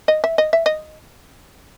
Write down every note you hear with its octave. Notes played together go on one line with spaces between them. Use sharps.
D#5
E5
D#5
E5
D#5